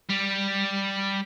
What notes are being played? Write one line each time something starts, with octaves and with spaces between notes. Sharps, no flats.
G3